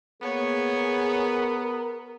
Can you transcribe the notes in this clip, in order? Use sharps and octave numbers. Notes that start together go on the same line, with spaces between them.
A#3 B3 G#4 C#5
A#4